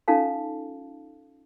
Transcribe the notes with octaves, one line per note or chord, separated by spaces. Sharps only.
C#4 D#4 F4 A4 F5 A5